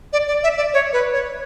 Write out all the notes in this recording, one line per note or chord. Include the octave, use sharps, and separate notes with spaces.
D5
D5
E5
D5
C#5
B4
C#5